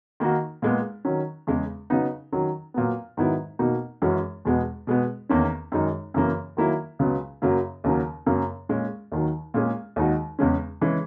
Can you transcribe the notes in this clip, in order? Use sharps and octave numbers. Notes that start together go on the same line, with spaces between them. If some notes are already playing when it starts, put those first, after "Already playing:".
D#3 A#3 D#4 F#4
A#2 G#3 B3
D#3 F#3 C#4
E2 C#3 G#3
C#3 F#3 B3 D#4
D#3 F#3 C#4
A#2 F#3 B3
G#2 D#3 F#3 B3 E4
B2 A#3 D#4 F#4
F#2 E3 G#3 C#4 F#4
E2 B2 G#3 B3
B2 G#3 B3
E2 D#3 A#3 C#4
F#2 D#3 G#3 D#4
F#2 C#3 E3 A#3
D#3 F#3 A#3 E4
C#2 C#3 F#3 B3
F#2 C#3 F#3 A#3
D#2 C#3 F#3 A#3
F#2 C#3 F#3 A#3
A#2 G#3 C#4
D#2 D#3 F#3
A#2 G#3 C#4 G#4
D#2 D#3 G#3 D#4 F#4
E2 C#3 G#3 C#4
C#3 E3 G#3 C#4